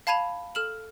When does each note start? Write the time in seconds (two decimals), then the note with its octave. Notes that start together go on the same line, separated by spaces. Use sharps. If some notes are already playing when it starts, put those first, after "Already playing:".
0.07 F5 A5 B5 G#6 D#7 F7
0.55 A4 F6 E7 F#7